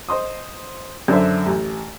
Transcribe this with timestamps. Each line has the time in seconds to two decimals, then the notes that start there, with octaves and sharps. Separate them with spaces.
0.09 C5 D#5 C6 D#6
1.08 F#2 D3 D4 A4 C5 E5
1.46 A1